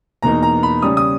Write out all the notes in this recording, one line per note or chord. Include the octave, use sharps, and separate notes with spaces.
E2 B2 A#3 D#4 A#5
A#5
B5
C#3 G3 C#4 D#6
D#6